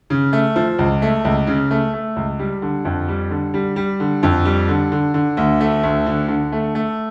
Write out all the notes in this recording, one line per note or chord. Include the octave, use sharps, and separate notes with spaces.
C#3
A3
F3
C#2
A3
C#2
C#3
A3
A3
C#2
G3
D3
F2
G3
D3
G3
G3
D3
F2
G3
D3
D3
D3
D2
A3
D2
D3
D3
A3
A3